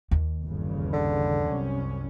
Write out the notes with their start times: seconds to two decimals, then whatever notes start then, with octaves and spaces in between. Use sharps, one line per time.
0.11 D#2
0.44 G1 E2 C#3
0.93 D3
1.47 C2 F#2 C#4